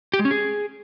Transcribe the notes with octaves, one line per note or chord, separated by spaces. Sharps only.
G4
G#3
C#4
G#4